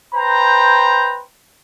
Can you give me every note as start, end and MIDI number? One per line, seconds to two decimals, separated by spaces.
0.15 1.22 71
0.15 1.22 72
0.15 1.22 79
0.15 1.22 82